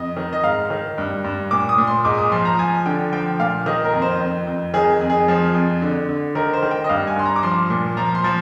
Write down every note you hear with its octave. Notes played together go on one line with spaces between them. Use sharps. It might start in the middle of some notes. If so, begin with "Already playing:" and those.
Already playing: F2 D#5
D#3
D#5
G#2 F5
D#3
G2
G2
A#2 D6
D#6
A#2
C6
G#2 D6
D#6
F3 C6
A#5
F3 G#5
D3 G5
F3 G5
A#2 F5
D#3 D#5
A#4
F2
C5
F2
F2
D#3 G#4
F2
G#4
F3
F2
D3
D3
D#3 A#4
C5
D#3
G5
D#5
G2 F5
G#5
G2 C6
A#5
D6
F3 C6
A#2
F3 A#5
C6
F3